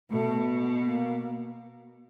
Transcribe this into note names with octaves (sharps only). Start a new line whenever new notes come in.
B2 A3
A#3